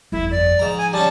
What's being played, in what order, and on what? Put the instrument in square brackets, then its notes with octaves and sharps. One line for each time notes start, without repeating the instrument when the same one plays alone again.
[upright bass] G1 F2 [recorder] E4
[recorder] D5
[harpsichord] G#2 A#5 [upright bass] F3
[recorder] G#5
[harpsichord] G3 C#4 [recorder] A5